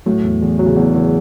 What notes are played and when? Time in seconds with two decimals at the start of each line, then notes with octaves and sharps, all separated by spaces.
0.06 A2 F#3
0.24 E2
0.41 E2
0.59 F#3
0.66 C#3
0.76 E2 B2
0.94 E2 C#3